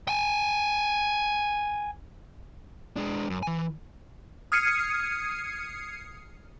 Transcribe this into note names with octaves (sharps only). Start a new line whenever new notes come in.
G5 G#5
G#3 D4
F#2
E3 G#5
D#6 F6 G#6 C7 C#7 D#7